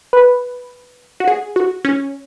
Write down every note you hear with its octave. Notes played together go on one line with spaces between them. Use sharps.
B4
F#4
G#4
F#4
C#4